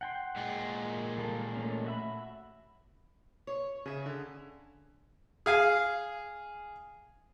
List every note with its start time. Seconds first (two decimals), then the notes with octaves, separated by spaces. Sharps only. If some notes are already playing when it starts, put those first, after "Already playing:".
0.01 F#5 G5 C6
0.36 A#2 G#3
1.18 G3 A#3 A4
1.56 A3 C#4
1.86 F#4 E5 B5
3.47 C#5
3.86 C#3 G#4 E5
4.06 D3
5.46 G#4 F5 G#5